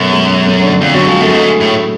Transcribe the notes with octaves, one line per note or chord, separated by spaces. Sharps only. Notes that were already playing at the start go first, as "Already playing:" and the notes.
Already playing: F#2 B2 A3 B3
G#3
A3
C#4
D3 D4
F2 D3 D4
F#2 F#3 F#4
F2 G#3 G#4
F#2 A3 A4
G#4
G#2 A3 A4
A2